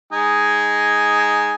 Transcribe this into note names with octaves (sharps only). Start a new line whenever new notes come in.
G#3 D#4 G#5